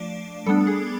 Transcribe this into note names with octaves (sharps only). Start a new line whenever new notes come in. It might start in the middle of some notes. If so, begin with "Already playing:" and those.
Already playing: F3 A3 D4 D5
G3 B3 D4 A4
G#4